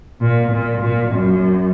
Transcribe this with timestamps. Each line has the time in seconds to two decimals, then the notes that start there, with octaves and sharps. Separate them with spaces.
0.22 A#2
0.52 A#2
0.82 A#2
1.12 F#2